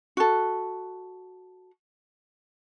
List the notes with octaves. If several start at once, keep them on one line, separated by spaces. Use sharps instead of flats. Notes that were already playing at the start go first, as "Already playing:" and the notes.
F#4 A4